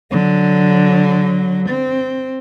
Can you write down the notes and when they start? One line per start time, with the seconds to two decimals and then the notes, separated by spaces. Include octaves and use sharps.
0.11 D3 F#3
1.69 C4